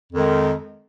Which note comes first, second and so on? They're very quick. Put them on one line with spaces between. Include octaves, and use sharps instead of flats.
F2 D#3 G#3